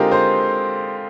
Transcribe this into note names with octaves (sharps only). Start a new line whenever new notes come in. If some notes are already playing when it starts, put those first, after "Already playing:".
Already playing: D3 G#3 C4 D#4 F4 G4 A#4
C5